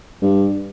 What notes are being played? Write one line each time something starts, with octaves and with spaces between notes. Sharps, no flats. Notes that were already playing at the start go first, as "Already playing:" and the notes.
G2